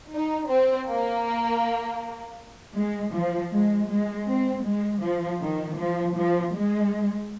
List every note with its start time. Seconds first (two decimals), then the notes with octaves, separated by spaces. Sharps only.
0.14 D#4
0.50 C4
0.89 A#3
2.77 G#3
3.15 F3
3.53 G#3
3.90 G#3
4.29 C4
4.66 G#3
5.04 F3
5.42 D#3
5.79 F3
6.17 F3
6.55 G#3